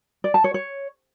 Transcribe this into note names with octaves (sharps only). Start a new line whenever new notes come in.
D5
A5
C#5
C#5